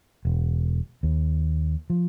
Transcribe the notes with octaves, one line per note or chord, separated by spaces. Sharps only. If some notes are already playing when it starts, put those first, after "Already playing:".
E1
D#2
F3